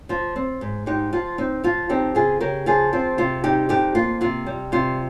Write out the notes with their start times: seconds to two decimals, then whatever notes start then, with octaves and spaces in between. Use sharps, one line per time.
0.09 F3 F4
0.36 C4
0.61 G#2
0.86 G#2 D#4 G4
1.13 F3 F4
1.38 C4 D#4
1.64 F3 F4
1.89 C4 D#4 G4
2.15 C#3 F4 G#4
2.40 C#3 G4 A#4
2.66 F3 F4 G#4
2.93 C4 F4
3.18 C3 F4
3.44 G3 D#4 G4
3.69 F2 D#4 G4
3.95 A#3 F4
4.21 C3 F4
4.46 G3
4.72 C3 F4